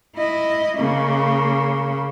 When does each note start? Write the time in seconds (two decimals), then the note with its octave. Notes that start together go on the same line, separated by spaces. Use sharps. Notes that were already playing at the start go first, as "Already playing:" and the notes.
0.15 E4 D#5
0.77 C#3 A#3